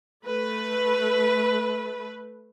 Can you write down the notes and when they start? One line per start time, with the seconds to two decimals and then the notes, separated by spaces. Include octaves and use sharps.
0.25 A3 B4